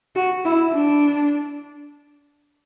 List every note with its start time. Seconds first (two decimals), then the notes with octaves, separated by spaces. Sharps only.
0.16 F#4
0.45 E4
0.73 D4